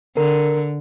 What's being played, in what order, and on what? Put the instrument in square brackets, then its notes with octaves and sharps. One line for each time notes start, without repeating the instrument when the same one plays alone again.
[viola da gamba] D3 [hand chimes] A#4